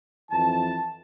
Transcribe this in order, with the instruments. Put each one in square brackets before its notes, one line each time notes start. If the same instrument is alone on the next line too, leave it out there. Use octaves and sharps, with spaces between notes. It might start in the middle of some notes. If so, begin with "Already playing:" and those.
[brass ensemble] F2 E3 A5